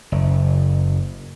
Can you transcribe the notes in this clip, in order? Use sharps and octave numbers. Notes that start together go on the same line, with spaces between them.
F#1